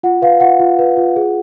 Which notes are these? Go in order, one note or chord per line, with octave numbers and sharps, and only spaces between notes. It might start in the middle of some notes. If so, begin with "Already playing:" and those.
F4 F#5
B4 F5
F4 F#5
F4
B4
F4
G#4